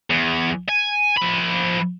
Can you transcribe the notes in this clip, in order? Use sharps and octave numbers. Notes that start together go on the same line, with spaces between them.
E2
G#5
F3 B5